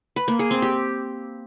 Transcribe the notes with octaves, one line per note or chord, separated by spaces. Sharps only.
B4
A#3
G#4
C4
G4